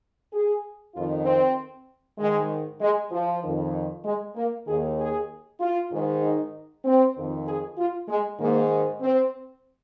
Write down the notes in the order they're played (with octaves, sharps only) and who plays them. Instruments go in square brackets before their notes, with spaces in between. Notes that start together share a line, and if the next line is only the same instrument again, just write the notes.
[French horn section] G#4
F2 D#3 F4
C4
G#2 D#3 G#3
G#3
F3
F2 D#3
G#3
A#3
D#2 D#3 G#4
G#4
F4
G#2 D#3
D#4
C4
F2 D#3
G#4
F4
G#3
G#2 D#3 A#3
C4